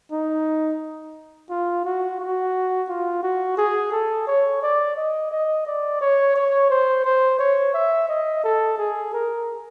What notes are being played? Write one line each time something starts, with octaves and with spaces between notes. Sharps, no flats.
D#4
F4
F#4
F#4
F4
F#4
G#4
A4
C#5
D5
D#5
D#5
D5
C#5
C#5
C5
C5
C#5
E5
D#5
A4
G#4
A#4